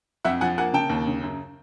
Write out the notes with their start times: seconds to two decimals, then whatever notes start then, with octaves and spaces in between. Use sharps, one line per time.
0.25 F2 E5 F#5
0.41 F3 F#5 G#5
0.58 A#3 F#5 G#5
0.73 C#3 G5 A5
0.89 D#2
1.07 C#3
1.22 F#2